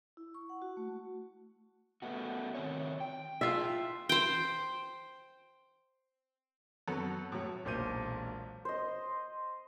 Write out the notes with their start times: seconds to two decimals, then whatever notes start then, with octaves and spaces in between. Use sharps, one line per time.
0.17 E4
0.34 C#6
0.49 F#5
0.62 F#4
0.77 A3
2.02 A3 B3 F#4
2.55 D#3 C4 C#5
3.00 G5
3.41 E4 F4 G#4 E5 G5
4.09 C5 G5
6.88 F#2 B3 F#4 A4
7.32 A2 F#3
7.64 E1 B1 A#2 C5 G6 D#7
8.65 C5 D#5